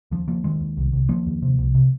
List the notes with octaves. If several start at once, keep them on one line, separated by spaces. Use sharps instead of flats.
D#2 F3
D#2 F3 A#3
D#2 D#3 G#3
D#2
C2
C2
D#2 F3 A#3
D#2
C3
C2
C3